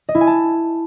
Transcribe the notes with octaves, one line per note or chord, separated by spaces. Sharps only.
D#5
E4
G#5
A5